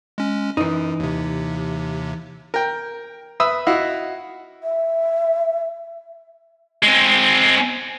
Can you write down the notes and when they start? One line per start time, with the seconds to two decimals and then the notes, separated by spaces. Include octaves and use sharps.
0.18 G#3 C#4
0.57 F#2 E3 D#4
1.00 D#2 C3
2.54 A#4 G5
3.40 B4 E5 D#6 E6
3.67 E4 F#4 D#5 F5
4.63 E5
6.83 G#3 C4